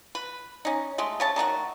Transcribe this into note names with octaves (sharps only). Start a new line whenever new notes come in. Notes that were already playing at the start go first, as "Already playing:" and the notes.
B4
C#4 D#4
G#3 A3 C6
C#3 C#5 A5
D#3 A3 D4 F#4